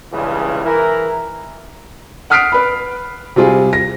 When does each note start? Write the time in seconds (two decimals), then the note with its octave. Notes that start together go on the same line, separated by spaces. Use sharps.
0.11 C#2 G2 C#3 E3
0.65 E3 E4 A#4
2.30 F#5 D#6 F6 B6 C7 D7
2.52 B4 B5
3.36 C3 G3 F4 G#4
3.73 A#6